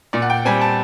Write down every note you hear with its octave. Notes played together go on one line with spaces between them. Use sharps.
A#2 D5
F#5
G5
G3 C4 G#5
A5